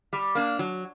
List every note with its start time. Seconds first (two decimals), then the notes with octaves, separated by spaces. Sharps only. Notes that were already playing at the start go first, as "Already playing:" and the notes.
0.13 G3
0.35 A#3 D4
0.59 F#3